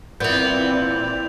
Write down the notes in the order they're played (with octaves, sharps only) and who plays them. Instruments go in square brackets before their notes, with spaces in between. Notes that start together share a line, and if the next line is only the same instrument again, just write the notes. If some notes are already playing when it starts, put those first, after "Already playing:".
[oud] A#2 E3 [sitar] B3 [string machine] C4 E4 D5 [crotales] G6 F7